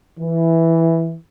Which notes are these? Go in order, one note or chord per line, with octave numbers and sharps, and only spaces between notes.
E3